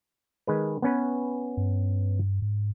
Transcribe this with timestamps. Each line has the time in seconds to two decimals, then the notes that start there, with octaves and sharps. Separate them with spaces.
0.47 D#3 G#3 B4
0.82 B3 C#4 B4
1.57 G2
2.42 G#2